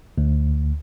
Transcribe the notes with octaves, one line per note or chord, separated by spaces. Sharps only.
D2